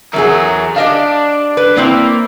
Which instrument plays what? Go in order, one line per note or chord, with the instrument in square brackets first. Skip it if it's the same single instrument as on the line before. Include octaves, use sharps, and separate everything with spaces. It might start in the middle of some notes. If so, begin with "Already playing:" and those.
[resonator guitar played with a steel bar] E2 F#3 G#4 [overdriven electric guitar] A#4 E5
[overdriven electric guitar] D4 [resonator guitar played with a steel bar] G4 D#5 F5
[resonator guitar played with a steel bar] B4
[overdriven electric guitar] A#3 [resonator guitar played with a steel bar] C4 E4 D5